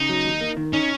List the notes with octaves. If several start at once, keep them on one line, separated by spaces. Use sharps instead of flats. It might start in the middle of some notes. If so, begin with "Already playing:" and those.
Already playing: C#3 D#4
F#3
D#2
A#3
D#3
C#4 D#4